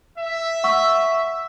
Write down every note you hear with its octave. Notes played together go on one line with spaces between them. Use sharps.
E5
F#5 C#6 E6